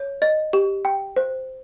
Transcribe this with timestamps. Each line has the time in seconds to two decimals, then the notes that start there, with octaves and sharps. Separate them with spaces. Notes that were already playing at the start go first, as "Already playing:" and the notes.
Already playing: C#5
0.22 D#5
0.53 G4
0.85 G5
1.16 C5